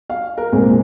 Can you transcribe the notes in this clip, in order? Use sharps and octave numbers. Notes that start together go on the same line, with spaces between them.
F5
A#4
C2 A#2 G#3 C4 G#4